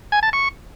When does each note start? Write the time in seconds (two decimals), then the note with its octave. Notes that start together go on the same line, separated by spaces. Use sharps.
0.12 G#5
0.23 A5
0.33 C#6